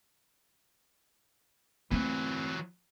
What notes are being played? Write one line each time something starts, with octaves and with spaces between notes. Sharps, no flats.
E3 F#3 A3 C4